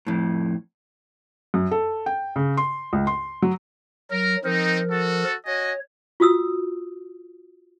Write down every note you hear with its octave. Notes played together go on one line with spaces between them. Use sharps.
F2 A2
F#2
A4
G5
C#3
C6
C#2
C6
F#3
F#3 A#4
F3 C4 D#4 A#4
F#4 A4
F#4 C#5 D#5 G#5
F4 F#4 D#6 E6